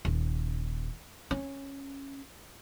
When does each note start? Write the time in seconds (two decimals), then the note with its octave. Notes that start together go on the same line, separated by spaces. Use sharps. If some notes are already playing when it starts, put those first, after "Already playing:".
0.05 D#1
1.31 C#4